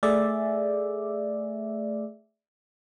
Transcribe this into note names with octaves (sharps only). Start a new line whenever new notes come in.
A3 G#4 D5 E5